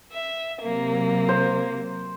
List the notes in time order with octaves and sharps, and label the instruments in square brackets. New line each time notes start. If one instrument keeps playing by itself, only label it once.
[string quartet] E5
[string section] C3 F#3 [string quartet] A#3
[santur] C5